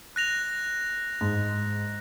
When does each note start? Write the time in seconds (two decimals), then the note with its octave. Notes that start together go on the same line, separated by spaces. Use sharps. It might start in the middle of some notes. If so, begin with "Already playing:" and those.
0.16 F#6 A#6 F7
1.21 G#2